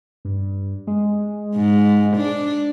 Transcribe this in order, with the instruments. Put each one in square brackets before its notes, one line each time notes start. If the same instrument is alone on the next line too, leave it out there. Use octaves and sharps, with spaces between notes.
[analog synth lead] G2
G#3
[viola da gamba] G#2
D4